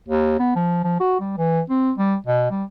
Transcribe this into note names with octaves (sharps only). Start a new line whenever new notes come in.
D#2
B3
F3
F3
F#4
G3
E3
C4
G3
B2
G3